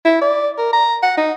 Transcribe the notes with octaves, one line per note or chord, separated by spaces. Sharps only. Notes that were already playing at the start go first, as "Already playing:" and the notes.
E4
D5
A#4
A#5
F#5
D#4